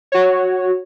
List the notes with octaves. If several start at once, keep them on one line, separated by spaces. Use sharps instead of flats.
F#4 C#5